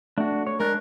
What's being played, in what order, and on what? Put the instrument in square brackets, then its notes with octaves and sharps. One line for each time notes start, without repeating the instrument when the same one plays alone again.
[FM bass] A3 [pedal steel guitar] D4 F#4
[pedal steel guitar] C#5
[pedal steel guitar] G#3 D4 F#6 [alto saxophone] A#4